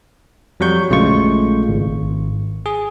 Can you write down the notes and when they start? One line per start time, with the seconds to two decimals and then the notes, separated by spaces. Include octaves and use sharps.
0.60 F2 F#3 G3 C#6 G6
0.90 A#1 C#3 G#3 A3 F4 C#6
1.68 G#1
2.66 G#4